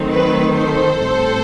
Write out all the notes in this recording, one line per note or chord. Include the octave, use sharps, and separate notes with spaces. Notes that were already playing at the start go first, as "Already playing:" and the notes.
Already playing: D#3 F#3 A3 C4
B4
A4 C5
A2 G3 C4